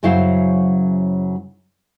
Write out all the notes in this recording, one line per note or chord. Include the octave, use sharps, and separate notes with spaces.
F#2 C#3 F#3 E4 C5 F5